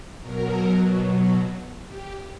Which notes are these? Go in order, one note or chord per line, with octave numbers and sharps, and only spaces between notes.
B2 F#3 A#4
G4